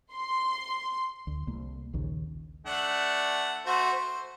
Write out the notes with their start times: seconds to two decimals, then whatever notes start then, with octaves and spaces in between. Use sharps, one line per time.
0.13 C6
1.27 D2
1.47 C2 A#3
1.93 A#1 D#2 C#3
2.67 A3 D4 F#5
3.66 A3 F#4 C5
3.93 C5